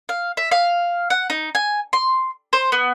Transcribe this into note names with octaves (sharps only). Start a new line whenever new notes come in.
F5
E5
F5
F#5
D#4
G#5
C6
C5
B3